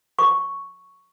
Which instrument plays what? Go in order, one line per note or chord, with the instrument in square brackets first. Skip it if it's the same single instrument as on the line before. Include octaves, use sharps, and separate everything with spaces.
[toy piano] C#6